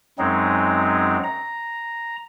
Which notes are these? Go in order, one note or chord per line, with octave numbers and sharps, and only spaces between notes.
F#2 F#3 G#3 C4 D#4
A#5